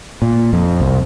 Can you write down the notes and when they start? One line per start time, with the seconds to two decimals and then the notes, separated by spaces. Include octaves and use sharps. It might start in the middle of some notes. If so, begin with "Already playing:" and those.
0.22 A#2
0.53 F2
0.80 C2